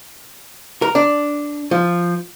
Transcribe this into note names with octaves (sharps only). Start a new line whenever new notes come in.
A#4
D4
F3